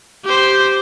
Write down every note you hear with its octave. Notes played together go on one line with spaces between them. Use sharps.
G4 C5